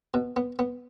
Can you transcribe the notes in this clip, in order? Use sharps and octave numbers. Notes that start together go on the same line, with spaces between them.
B2
B3
B3